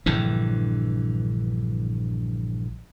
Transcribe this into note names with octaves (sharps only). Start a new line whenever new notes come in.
A#1 G2 D3 E3